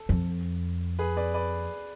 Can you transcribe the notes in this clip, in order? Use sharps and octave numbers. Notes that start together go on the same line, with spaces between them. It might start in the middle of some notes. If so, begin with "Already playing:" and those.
Already playing: A4
F2
G#4 B4
B4 D5
B4 D5